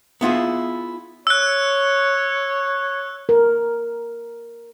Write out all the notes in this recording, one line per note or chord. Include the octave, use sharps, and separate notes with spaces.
B3 E4 F4 G#4
C#5 E6 F#6
A#4